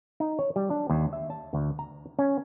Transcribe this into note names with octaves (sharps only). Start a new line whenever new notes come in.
D#4
C#5
G3
D4
D#2
E5
A5
D2
A#5
C#4